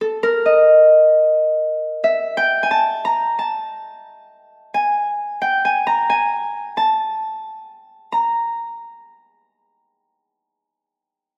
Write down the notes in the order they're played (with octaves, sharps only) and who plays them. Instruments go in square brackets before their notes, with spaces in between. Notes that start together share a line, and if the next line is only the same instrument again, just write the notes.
[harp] A4
A#4
D#5
E5
G5
G#5
A5
A#5
A5
G#5
G5
G#5
A#5
G#5
A5
A#5